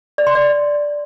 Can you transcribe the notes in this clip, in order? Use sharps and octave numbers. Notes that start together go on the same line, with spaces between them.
D5
C6
D5